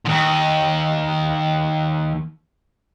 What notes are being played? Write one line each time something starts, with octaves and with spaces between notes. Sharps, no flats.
D#2 G#2